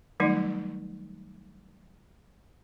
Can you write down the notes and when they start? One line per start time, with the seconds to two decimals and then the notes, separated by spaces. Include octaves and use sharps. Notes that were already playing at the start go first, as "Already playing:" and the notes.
0.20 D#3 F#3 G3 A3 D#4